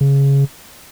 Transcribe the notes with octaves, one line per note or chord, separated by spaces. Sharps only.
C#3